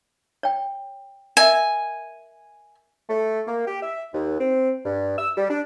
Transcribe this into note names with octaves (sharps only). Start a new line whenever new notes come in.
C#5 G5
A#4 D#5 E5 G#5
A3
A#3
G4
E5
D#2
C4
G2
E6
G3
D4